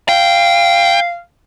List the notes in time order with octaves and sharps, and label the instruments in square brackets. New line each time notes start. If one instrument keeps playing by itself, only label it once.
[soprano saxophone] F5 [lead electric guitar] G5